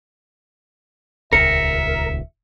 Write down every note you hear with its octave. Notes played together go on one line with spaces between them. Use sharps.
D#1 C#2 A#4 E5 C#7